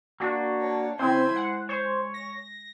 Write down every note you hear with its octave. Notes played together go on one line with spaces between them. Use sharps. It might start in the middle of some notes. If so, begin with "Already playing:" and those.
A#3 D4 F#4
C#5 A5
C#3 C4 E4 C5 G#5
G#3 F#5
C5 C#5
A#6